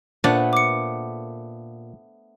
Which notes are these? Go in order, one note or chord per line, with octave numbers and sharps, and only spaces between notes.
A#2 A3 B3 D4 C5 F#5
D6 C#7